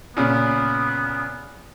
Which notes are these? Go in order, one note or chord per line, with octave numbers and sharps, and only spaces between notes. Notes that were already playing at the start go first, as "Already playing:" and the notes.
A#2 C#3 B3